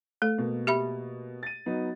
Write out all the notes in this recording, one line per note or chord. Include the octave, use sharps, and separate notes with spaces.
A3 A4
B2 A#3
G4 E5 B5
A6 D#7
F#3 B3 D#4